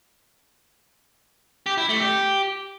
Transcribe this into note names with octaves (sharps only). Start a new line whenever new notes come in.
G4
E4
A3
G4